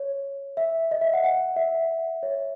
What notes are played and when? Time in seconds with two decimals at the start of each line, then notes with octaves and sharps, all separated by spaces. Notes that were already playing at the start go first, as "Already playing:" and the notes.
Already playing: C#5
0.57 E5
0.91 D#5
1.01 E5
1.13 F#5
1.24 F#5
1.56 E5
2.23 C#5